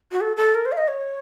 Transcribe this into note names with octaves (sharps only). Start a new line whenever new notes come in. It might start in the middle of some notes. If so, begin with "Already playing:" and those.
F#4
A4
A4
A#4
C5
F5
D#5
C#5